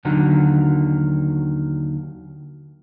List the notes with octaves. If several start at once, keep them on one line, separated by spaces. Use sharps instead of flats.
D#2 D3 D#3 F#3